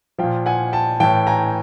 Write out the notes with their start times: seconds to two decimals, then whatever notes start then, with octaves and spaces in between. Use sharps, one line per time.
0.18 A#2 F3 F5 G5
0.46 F#5 G#5
0.73 G5 A5
1.00 A2 E3 G5 A5
1.27 G#5 A#5